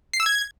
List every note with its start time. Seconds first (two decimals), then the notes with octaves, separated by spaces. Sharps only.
0.13 C7
0.20 E6
0.26 G#6